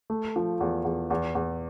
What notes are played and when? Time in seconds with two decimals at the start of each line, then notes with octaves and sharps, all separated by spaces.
0.10 A3
0.36 F3
0.60 E2
0.85 E2
1.10 E2
1.35 E2